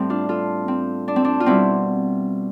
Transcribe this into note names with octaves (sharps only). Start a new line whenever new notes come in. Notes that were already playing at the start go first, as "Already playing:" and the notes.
Already playing: A2 G3 C4
D4 F4
F4 A4
C4
D4
C4
D4
F4
B2 G3 C4 E4